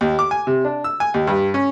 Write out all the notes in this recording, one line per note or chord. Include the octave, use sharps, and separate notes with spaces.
D#2
D6
G#5
C3
D4
E6
G#5
D#2
G2
C#4